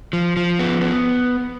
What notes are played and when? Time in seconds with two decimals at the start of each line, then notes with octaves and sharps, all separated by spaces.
0.13 F3
0.37 F3
0.59 B3
0.81 B3